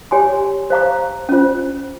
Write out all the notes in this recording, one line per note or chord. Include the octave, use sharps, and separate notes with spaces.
G4 C#5 G#5 C6
C5 F5 A#5 C#6
C#4 F4 C5